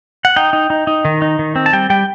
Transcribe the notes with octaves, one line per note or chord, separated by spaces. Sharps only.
F#5
D#4 G5
D#4
D#4
D#4
D#3
D#4
D#3
C4
A5
G3 G5
G3 G5